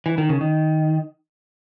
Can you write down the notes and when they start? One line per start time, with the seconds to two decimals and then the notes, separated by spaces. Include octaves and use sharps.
0.06 E3
0.18 D#3
0.29 C#3
0.41 D#3